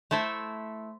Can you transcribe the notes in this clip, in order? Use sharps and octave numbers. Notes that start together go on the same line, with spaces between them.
A3 E4 A4 C5 E5